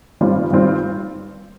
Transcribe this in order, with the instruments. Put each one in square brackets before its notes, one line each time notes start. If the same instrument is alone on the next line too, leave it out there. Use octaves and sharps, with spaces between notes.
[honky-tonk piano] G2 D#3 G3 C4 F4
G2 D#3 G3 C4 F4